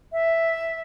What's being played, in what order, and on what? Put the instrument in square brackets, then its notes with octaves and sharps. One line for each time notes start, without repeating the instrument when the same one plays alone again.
[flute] E5